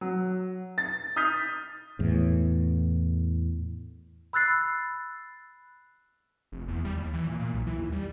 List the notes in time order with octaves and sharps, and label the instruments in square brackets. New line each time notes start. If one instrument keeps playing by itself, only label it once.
[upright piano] F#3
A6
D#6 F6 G6 B6
[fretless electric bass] E2 A2
[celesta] B5 E6 F#6 A6 C7
[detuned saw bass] F1
E2
G3
D#2
E3
A#2
A#2
B1
E3
D#2
G3